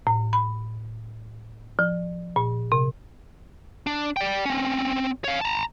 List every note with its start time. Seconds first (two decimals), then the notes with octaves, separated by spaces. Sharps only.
0.07 A2
0.33 B5
1.79 F3
2.36 A#2
2.72 C3
3.87 D4
4.17 D5 G5
4.45 C4 C#4
5.24 C#5 F5
5.41 A5 A#5